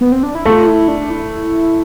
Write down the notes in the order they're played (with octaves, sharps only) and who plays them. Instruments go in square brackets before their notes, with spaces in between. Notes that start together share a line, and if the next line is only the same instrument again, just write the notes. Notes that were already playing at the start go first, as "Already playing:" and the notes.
[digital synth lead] B3
C4
D4
E4
[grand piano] A3 [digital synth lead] F4
[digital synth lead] E4
D4
E4